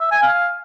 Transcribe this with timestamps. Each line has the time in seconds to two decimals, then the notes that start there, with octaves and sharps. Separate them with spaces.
0.01 E5
0.11 G#5
0.22 F5